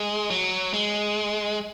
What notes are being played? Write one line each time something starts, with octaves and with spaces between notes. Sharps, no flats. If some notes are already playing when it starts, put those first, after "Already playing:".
Already playing: G#3
F#3
G#3